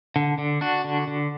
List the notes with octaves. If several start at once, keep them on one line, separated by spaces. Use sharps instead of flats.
D3
D3
D4 F#4
D3
D3